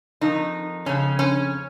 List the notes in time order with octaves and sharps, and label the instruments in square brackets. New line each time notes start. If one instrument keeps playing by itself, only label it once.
[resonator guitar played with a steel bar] F2 D#3 D#4
F2 C#3 C#4
C#4